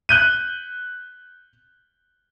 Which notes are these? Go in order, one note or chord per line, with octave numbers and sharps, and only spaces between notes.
F#6 G6 D#7